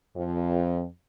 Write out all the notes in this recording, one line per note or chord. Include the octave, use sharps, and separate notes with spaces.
F2